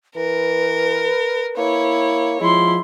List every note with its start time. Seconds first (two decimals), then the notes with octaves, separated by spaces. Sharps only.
0.16 E3 A#4 B4
1.57 A#3 E4 C#5
2.40 F3 G#3 E4 C6